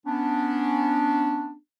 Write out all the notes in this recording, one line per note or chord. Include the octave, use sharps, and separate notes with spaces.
B3 C#4 D4